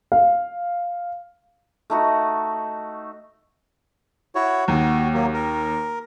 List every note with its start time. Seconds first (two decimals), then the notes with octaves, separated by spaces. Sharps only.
0.12 F5
1.90 A3 D#4 F#4
4.35 E4 F#4 C#5
4.68 D#2 F#4
5.14 F#3 A#3
5.34 A#4